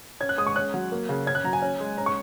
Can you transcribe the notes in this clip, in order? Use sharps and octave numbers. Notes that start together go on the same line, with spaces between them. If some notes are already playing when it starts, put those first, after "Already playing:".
C#4 G#6
F#6
G#3 D#6
C#6
C#4 F#6
F#3
A#3
C#3
C#4 G#6
F#6
F#3 A#5
G#5
C#4
G#3
C#4 A#5
C#6